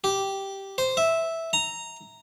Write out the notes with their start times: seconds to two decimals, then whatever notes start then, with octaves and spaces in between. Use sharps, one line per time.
0.04 G4
0.78 C5
0.97 E5
1.53 A#5